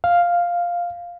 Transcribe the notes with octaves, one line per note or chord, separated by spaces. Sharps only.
F5